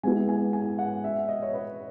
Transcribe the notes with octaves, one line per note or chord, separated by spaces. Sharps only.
G#3 B3 E4 G#5
G#5
G#5
F#5
E5
D#5
C#5
B4